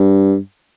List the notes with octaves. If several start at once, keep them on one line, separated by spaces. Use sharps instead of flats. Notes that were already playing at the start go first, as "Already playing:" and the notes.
Already playing: G2